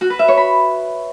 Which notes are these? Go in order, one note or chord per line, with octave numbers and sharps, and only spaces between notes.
F#4
B4
E5
C#5
B5